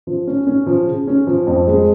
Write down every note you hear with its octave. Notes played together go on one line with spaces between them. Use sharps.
F3
C#4
C#4
F3
C#3
C#4
F3
F2
G#3